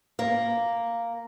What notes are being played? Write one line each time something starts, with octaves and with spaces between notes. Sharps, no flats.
A#3